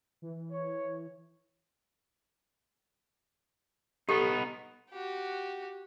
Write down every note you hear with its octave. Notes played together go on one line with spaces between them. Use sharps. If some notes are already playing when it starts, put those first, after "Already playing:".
E3
C#5
B3 D#4 G4 A4
F#4 G4